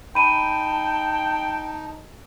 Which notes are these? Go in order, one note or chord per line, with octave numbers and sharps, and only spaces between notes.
D#4 G5 A5 B5 D#7